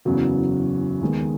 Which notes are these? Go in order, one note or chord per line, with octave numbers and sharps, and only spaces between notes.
F#1 E2 C#3 F#3 B3
D#2 D#3 G#3 B3